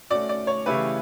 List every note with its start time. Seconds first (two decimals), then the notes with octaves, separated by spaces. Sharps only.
0.10 A3 C#4 F#4 D5
0.29 D5
0.47 C#5
0.66 C#3 E3 A3 E4 G4 B4